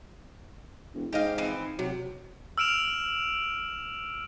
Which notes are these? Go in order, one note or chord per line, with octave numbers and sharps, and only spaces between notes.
E1
G#2 G4 D#5 F5
E3 F3 C4
C3 F#3
E6 F6 D7 E7 F7